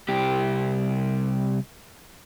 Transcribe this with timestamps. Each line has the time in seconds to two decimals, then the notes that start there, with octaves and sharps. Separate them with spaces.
0.09 C2 G4